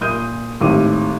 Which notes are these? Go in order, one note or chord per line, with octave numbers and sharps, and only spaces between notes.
A#2 C6 D#6 G6 D#7
G#1 A2 G4 D6 D#7